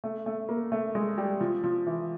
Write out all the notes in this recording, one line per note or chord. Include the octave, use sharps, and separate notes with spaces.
A3
A3
A#3
A3
G#3
G3
F3
F3
E3